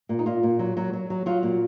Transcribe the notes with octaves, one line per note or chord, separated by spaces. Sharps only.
A#2
D#4
A#2 F4
A#2
F#3
F#3
F#3
F#3
F#3 F4
A#2